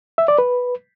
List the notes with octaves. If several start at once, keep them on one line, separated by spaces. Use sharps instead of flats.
E5
D5
B4